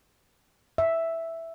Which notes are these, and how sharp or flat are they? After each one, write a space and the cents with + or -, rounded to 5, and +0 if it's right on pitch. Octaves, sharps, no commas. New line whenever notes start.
E5 +0